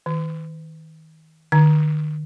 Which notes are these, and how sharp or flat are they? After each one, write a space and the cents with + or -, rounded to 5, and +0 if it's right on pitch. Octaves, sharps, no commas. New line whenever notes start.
D#3 +35
D#3 -40